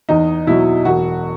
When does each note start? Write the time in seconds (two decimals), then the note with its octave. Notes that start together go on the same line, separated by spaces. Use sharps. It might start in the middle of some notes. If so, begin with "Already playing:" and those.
0.09 E2 D#4
0.47 B2 F#3 E4
0.85 E1 F#4